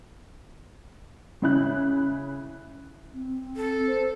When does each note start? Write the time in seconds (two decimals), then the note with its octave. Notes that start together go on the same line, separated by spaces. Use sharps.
1.42 C#3 E4 F#6
3.14 C4
3.56 A4
3.87 C5